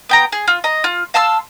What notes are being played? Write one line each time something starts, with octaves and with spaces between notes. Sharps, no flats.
B3 G5 A#5
G#4
F4
D#5 A#5
F4
F5 A5 C6 E6